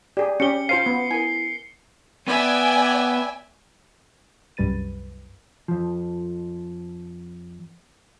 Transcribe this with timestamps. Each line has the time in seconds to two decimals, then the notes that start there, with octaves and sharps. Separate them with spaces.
0.17 G4 G#4 D5
0.40 C#4 G4 C#7 G7
0.69 F4 C5 F5 C7 D#7
0.86 B3
1.11 E4 A#4 G#5
2.28 B3 D5 E5 G5 G#5
4.57 C2 F#2 G3 B4 A6 D#7
5.68 F2 F3